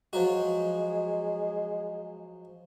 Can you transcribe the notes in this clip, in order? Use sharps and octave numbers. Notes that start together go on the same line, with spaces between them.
F3 F#3 G#3 F#4